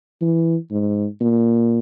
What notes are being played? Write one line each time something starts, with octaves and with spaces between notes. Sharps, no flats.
E3
G#2
A#2